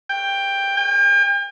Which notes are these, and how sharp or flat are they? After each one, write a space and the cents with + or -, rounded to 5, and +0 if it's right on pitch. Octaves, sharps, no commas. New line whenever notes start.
G5 +10
G5 +40